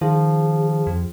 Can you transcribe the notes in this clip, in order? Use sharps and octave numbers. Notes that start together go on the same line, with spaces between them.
D#3 F3 G#4
F2